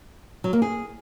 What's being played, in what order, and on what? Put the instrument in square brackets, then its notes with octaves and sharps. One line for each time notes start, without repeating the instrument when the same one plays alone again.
[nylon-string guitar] F#3
A#3
G#4